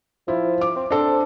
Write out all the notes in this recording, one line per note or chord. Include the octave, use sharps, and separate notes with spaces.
F3 E4
D6
C4
C4 D4 A4